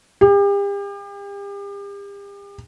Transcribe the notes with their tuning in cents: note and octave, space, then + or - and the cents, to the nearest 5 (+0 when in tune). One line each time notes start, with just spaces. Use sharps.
G4 +40